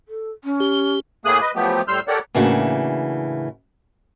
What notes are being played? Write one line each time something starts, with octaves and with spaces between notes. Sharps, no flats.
A4
C#4
G4
A2 A3 A#3 G#4 D#6 F#6
B4 D#5
F3 F#3 A3 B3 G4
A2 G3 C6 E6 F6 G6
G4 A4 A#4 C#5 D5 F#5
A2 C#3 E3 A#3 D4 F#4